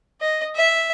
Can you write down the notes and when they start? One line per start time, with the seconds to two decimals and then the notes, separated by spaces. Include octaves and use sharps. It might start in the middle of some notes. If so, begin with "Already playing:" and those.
0.21 D#5
0.56 E5